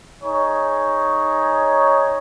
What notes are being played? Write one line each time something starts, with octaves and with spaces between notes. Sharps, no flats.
D#4 G#4 C#5